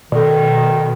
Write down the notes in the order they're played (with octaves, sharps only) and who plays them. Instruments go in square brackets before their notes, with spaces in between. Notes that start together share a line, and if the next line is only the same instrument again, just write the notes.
[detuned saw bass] B2 [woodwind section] D#3 [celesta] A4 D5